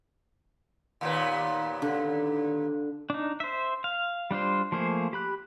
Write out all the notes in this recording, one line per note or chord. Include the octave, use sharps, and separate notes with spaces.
D#2 A#2 B3
D3
D4 D#4
C5 E5
F5
G3 D4 F4 C5
F3 A3 A#3 G#4 C5
G4 B5 F#6